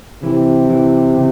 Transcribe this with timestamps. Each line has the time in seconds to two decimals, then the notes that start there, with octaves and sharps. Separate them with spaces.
0.23 C3 E3
0.69 E3
1.15 C#3